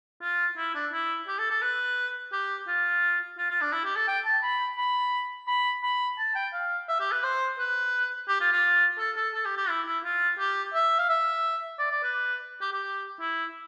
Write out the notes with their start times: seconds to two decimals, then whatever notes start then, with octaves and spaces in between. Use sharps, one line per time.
0.21 F4
0.57 E4
0.75 D4
0.92 E4
1.28 G4
1.39 A4
1.51 A4
1.62 B4
2.32 G4
2.67 F4
3.38 F4
3.50 F4
3.61 D4
3.73 E4
3.84 G4
3.96 A4
4.08 G5
4.25 A5
4.43 B5
4.78 B5
5.47 B5
5.83 B5
6.18 A5
6.35 G5
6.53 F5
6.88 E5
7.00 G4
7.12 B4
7.23 C5
7.59 B4
8.29 G4
8.40 F4
8.52 F4
8.98 A4
9.16 A4
9.34 A4
9.45 G4
9.57 G4
9.69 E4
9.86 E4
10.04 F4
10.39 G4
10.74 E5
10.99 F5
11.09 E5
11.79 D5
11.91 D5
12.03 B4
12.61 G4
12.72 G4
13.20 E4